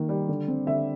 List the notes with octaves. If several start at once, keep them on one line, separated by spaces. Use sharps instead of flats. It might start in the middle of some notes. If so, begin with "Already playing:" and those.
Already playing: D#3 A#3
G3
D3
C4
D3 E5